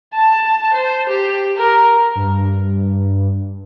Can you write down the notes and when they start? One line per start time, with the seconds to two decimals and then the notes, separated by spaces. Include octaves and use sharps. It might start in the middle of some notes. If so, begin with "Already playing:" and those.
0.13 A5
0.74 C5
1.09 G4
1.57 A#4
2.15 G2